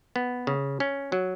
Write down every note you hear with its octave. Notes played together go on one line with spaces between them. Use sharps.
B3
C#3
C#4
F#3